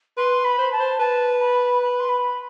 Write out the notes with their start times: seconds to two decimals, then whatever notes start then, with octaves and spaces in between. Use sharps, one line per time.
0.17 B4 C6
0.44 B5
0.58 C5
0.72 A5
0.80 C5
0.99 B4 A5
1.41 B5
1.82 B5
2.00 C6
2.09 B5